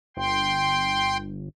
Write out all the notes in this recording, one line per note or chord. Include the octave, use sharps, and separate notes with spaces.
G1 G5 C6